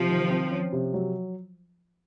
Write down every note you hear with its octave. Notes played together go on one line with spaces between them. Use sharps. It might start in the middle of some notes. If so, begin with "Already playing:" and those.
Already playing: C3 F3
D#3
C4
C#4
C3
F#3